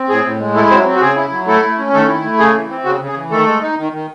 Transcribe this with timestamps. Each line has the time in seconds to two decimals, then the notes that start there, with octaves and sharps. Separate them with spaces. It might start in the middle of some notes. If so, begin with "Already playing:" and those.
Already playing: C4
0.09 A2 G#4
0.25 A2
0.40 G#3
0.55 A3 E4 A4
0.70 F#3 C4 C5
0.86 C4
0.96 F#4
1.01 C#3 G#4
1.16 E4
1.32 F#3
1.47 A3 E4 A4
1.63 A3
1.78 C#4
1.93 D#3 A3 A4
2.08 E4
2.23 A3
2.39 C#3 G#4
2.54 E3
2.70 C4
2.85 C#3 F#4
3.01 C#3
3.08 G#4
3.15 E3
3.31 D#3 A3 A4
3.47 G#3
3.61 D#4
3.77 D#3
3.92 D#3